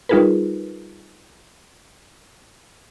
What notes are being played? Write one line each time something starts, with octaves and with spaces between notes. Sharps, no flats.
G3 D#4 F4 G#4 A#4 B4